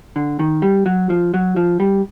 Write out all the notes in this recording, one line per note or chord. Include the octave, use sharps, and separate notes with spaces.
D3
D#3
G3
F#3
F3
F#3
F3
G3